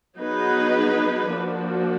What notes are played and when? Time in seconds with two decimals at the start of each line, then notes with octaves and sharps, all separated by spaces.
0.19 F#3 B3 D#4 G#4 B4
1.31 F3 A#3 D4 F#4